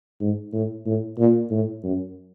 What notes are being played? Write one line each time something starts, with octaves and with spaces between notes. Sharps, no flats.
G#2
A2
A2
A#2
A2
F#2